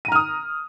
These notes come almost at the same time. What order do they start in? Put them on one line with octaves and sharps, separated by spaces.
D#7 A#5 F6 D#6